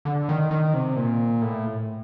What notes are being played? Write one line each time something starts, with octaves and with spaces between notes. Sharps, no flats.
D3
D#3
D#3
C3
A#2
A2